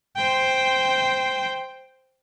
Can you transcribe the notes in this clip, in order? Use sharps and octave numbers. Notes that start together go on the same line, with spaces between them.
C5 G5